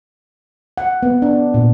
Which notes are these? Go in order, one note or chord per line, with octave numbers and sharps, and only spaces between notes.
F#5
B3
D4
A#2